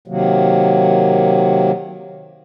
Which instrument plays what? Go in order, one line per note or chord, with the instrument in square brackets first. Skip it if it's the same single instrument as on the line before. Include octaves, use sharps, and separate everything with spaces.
[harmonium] C3 D#3 F#3 A#3